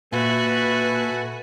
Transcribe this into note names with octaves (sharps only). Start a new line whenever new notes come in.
A#2 F#4 A4 B4 E5 G#5